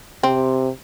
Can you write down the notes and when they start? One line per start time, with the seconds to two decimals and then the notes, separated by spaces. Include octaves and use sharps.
0.23 C3 C4